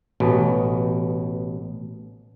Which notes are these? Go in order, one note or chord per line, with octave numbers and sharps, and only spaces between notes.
A1 B2